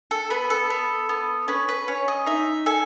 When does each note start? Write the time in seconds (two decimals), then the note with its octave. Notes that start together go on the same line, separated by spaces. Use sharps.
0.11 A4
0.30 B3 B4
0.50 A4
0.70 B3
1.09 B3
1.48 C#4 B4
1.69 B4
1.88 C#4 C#5
2.08 D#5
2.26 D#4 E5
2.66 A4 G#5